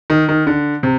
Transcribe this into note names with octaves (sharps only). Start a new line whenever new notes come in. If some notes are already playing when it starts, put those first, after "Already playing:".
D#3
D#3
D3
C3